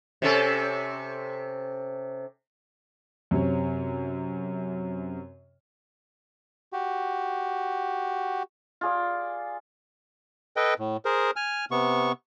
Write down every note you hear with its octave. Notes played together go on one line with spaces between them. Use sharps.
C3 C#4 A4
F#2 C3 C#5
F#4 G4
F4 G#4 D5
A4 B4 D#5 G5
A2
G#4 A#4 C5
G#5 F6
C3 B3 C#6